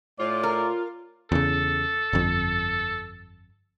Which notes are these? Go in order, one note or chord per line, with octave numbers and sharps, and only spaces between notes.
A2 F4 D5
A#4
E2 C#3 A4
G1 F2